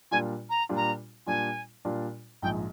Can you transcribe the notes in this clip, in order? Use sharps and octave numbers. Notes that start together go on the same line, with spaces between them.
A#2 G3 D4 F4 G#5
A#5
A#2 G3 D4 F4
A#5
A#2 G3 D4 F4 G#5
A#2 G3 D4 F4
A#1 G#2 F3 G#3 G5